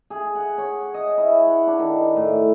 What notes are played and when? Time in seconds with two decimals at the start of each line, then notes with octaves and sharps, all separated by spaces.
0.10 G#4
0.35 F#5
0.58 C#5
0.94 D#5
1.18 E4
1.47 F#5
1.67 D4
1.79 D#3
2.16 A2